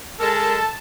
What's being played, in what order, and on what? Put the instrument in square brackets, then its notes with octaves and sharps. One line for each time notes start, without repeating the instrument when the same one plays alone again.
[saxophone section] G#3 A#4 [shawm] A4 [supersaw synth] A5